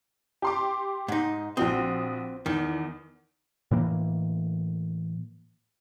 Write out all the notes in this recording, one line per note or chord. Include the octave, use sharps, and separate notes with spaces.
G4 C6 D6
G#2 D#4
A#1 C4 F#4 D#6
E2 D#3
A2 E3 A#3